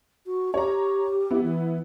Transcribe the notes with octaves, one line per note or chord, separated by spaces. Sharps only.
F#4
G4 C#5 A#5
B3 E4
E3